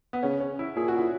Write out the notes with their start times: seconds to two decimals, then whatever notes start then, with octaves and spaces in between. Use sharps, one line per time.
0.13 B3
0.23 C#3 C#4
0.40 C#4
0.59 E4
0.76 A#2 G#4
0.88 F#4
0.99 E4